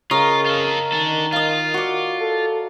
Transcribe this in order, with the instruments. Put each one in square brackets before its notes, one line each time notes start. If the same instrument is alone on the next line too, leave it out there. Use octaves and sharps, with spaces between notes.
[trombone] C#3 [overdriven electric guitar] F4 [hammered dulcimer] A#4 D#5 C#6
[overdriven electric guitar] F4 A4
[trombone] D#3 [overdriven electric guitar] D4 A4
[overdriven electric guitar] F4 [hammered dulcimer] D#5 F5
[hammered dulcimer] F#4 D5
[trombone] A4